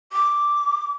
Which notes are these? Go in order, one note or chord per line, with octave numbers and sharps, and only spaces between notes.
D6